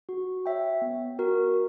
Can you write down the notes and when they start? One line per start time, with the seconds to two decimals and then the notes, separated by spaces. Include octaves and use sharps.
0.09 F#4
0.46 C#5 E5 G5
0.82 B3
1.19 F#4 A#4